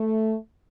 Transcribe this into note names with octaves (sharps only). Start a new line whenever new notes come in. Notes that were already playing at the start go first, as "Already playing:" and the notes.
Already playing: A3